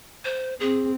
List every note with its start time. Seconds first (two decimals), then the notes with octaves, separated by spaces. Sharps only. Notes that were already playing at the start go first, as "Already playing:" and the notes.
0.24 C5
0.60 C4 G#4